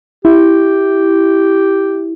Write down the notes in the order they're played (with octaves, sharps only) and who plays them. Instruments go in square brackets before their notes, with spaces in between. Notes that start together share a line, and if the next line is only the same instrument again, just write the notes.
[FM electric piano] E4 [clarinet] G4